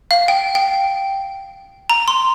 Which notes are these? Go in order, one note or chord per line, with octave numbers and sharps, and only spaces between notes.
F5
G5
G5
A#5
C6